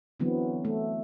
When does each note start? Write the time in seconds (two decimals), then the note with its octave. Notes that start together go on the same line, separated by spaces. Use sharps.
0.20 D3 E3 F#3 B3 C4
0.65 A3